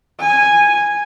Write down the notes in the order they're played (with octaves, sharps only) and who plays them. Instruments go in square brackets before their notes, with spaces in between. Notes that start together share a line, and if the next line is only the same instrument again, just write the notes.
[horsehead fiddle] G#5